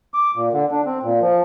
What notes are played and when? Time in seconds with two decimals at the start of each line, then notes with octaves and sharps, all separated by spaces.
0.14 D6
0.36 A#2
0.53 D3
0.71 D4
0.85 C4
1.03 A#2
1.22 F3